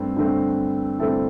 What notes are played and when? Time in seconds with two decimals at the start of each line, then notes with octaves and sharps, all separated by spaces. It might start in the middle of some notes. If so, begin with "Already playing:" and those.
Already playing: G2 A3 C4
0.16 G2 D3 A3 C4
0.99 G2 D3 A3 C4 E4 A4